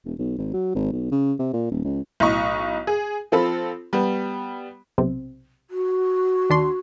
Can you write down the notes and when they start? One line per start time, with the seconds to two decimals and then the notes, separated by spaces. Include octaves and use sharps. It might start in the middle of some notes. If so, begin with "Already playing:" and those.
0.05 E1
0.19 B1
0.38 G#1
0.54 F#3
0.75 G#1
0.92 B1
1.12 C#3
1.39 C3
1.53 A#2
1.71 D#1
1.85 C#2
2.20 B1 A2 D#5 C#6
2.87 G#4
3.32 F3 C4 F4 A4 B5
3.93 G3 B3
4.98 B1 C3 C4
5.70 F#4
6.50 D#2 D4 C6